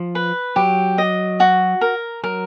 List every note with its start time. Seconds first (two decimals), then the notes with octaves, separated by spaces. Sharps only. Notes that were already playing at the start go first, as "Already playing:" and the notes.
Already playing: F3
0.15 B4
0.56 F#3 G4
0.98 D#5
1.40 F#4
1.81 A#4
2.24 F#3 A#4